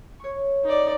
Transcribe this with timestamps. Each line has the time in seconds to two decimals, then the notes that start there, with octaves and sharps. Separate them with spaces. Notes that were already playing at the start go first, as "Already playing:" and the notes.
0.20 C#5 C#6
0.64 D#4 D5